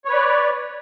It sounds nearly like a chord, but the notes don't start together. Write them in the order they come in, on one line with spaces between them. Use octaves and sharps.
C#5 B4 D5